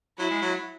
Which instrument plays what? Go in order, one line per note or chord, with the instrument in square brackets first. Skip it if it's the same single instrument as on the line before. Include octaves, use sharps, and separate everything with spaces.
[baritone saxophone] F#3 [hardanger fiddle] E4
[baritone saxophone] G#3
F#3